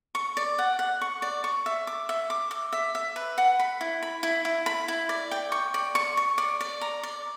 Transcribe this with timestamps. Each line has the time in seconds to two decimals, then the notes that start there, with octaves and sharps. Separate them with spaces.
0.15 C#6
0.37 D5
0.58 F#5
0.79 F#5
1.01 C#6
1.22 D5
1.44 C#6
1.66 E5
1.87 D6
2.09 E5
2.30 D6
2.51 D6
2.73 E5
2.95 E5
3.16 B4
3.38 F#5
3.60 B5
3.81 E4
4.03 B5
4.23 E4
4.45 E4
4.66 B5
4.88 E4
5.09 D5
5.31 G5
5.52 C#6
5.74 D5
5.95 C#6
6.17 C#6
6.38 D5
6.61 D5
6.81 A#5
7.03 D5